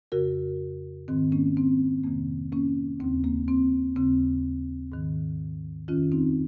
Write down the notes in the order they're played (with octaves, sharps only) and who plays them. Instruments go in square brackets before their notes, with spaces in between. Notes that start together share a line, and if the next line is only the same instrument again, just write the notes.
[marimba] F2 C#3 F#4 A#4
G#2 D#3 C4
A#3 C#4
C4
F2 C3 D#3 A#3
A#3 C#4
D#2 C#3 C4
A#3
C4
D#2 C#3 C4
G#2 D#3
F2 D#3 C#4 F4
C4 D#4